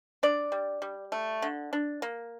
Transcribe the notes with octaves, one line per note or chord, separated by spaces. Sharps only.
D4 D5
G3
G3
A3
D3
D4
A#3